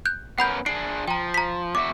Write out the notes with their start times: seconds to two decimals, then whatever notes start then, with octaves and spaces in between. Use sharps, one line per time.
0.05 F#6 G6
0.38 B3 C#4 A#4 F#5 B5 G6
0.66 D4 G#4 C7 D7
1.08 F3 G5 A#5
1.34 A#5 B6
1.75 E2 F#4 E5 D6